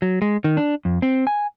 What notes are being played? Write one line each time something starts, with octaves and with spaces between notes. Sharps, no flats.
F#3
G#3
D#3
D4
F2
C4
G#5